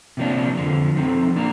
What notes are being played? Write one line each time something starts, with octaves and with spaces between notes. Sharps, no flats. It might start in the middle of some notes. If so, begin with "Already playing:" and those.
C3 F3 A#3 D4
F2 D3 F3
F3 C4 D#4 A4
F3 A#3 D4 A#4